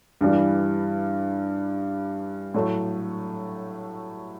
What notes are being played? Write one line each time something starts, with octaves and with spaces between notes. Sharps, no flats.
G2 E3 G3
A2 F#3 A3